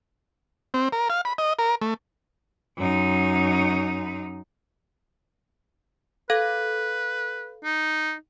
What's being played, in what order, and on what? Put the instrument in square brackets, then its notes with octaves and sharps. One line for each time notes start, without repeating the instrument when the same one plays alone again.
[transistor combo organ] C4
A#4
F5
B5
D#5
A#4
A3
[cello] F#2 D#4
[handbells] A4 F5 G#6 [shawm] B4
[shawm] D#4